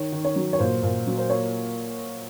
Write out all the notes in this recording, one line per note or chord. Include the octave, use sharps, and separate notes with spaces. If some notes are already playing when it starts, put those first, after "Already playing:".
Already playing: D#3 C#5
D#3
C#5
F#3
C#5
A#2 C5
A#2
F#3
C5
A#3 C#5